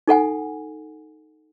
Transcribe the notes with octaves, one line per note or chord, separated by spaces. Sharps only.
D#4 A4 F#5 G#5